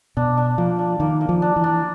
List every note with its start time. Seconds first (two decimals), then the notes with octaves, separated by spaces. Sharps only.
0.17 B2 D4
0.37 D4
0.58 F3 A#3
0.79 D4
1.00 D#3 A#3
1.21 A#3
1.29 F3
1.42 D4
1.56 E3
1.64 D4